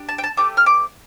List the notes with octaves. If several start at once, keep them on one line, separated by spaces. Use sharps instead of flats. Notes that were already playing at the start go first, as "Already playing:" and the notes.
Already playing: D4 G4
A5
G5
A5
A3 C4 G4 D6
F6
D6